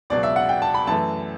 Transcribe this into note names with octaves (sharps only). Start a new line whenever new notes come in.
C#2 B2 F#3 D5
E5
F#5
G5
A5
B5
F#2 E3 A3 A5